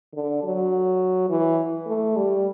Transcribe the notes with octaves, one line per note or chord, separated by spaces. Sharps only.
D3
F#3
E3
A3
G3